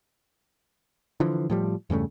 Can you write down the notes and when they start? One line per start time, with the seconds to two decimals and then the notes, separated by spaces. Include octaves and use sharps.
1.20 D3 E3 F3
1.50 A2 F3 G3
1.90 E2 G2 C#3 A3